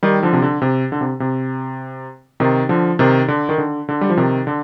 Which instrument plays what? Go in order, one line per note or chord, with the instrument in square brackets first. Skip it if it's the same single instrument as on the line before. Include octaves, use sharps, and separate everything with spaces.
[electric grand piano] D#3 G3
D3 F3
C3
D3
C3
D3
C3
C3
C3 D#3
D3 F3
C3 D#3
D3
D#3
D3
D3
G3
F3
C3 D#3
D3